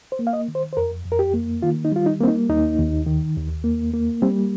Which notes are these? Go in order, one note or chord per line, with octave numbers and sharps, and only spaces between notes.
C5
A#3
F5
D#5
D#3
C5
C5
F2 A#4
F2
A#4
G4
A#3
D#3 F4
D#4
G3 F4
D#4
A#3 C4
D#4
D#2 D#4
D#2
D#3
D#2
A#3
A#3
G3 C4